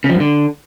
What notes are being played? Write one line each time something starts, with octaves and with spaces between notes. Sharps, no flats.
C#3
F3
G2
D3